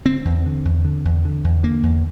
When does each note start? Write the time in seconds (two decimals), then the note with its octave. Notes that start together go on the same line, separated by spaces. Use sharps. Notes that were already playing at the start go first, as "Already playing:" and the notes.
0.05 D3 C4
0.25 E2
0.46 D3
0.65 E2
0.85 D3
1.05 E2
1.25 D3
1.44 E2
1.63 D3 A#3
1.83 E2